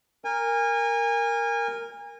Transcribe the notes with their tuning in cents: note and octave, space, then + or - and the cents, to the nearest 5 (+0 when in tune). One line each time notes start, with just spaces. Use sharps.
A#4 -5 G#5 -30